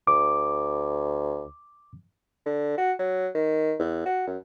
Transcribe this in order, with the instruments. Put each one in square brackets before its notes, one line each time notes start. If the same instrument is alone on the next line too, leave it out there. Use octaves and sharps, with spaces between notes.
[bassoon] D2 [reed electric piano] D6
[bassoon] D3
F#4
F#3
D#3
E2
F#4
F#2